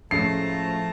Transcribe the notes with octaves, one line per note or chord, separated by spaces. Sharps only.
A2 F3 G#3 A3 C#4 A5 A#5 C7